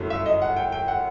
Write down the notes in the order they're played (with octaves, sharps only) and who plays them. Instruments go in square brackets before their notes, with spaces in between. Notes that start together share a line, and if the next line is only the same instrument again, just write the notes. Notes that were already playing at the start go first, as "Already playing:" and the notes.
Already playing: [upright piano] G1 F#2 F#3 A3 E4
E5
D#5
F#5
G5
G5
F#5